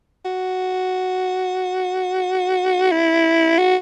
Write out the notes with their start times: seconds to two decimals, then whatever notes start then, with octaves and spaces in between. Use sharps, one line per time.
0.25 F#4
2.92 E4
3.58 F#4